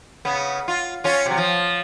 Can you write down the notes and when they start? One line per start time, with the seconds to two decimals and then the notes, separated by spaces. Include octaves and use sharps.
0.25 C#3 B3
0.68 F4
1.04 C#4 F4
1.26 C3 F#3
1.37 F3